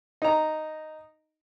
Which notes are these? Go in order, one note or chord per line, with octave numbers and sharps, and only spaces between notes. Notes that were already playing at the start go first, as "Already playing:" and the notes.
D#4 A#5